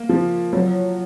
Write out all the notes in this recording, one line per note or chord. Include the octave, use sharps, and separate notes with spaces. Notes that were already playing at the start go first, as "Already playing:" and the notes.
Already playing: A#3
F3
F#3